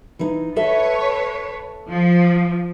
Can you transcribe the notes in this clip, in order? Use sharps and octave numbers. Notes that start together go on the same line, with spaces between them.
E3 D#4
A4 B4 C#5 E5 A5
F3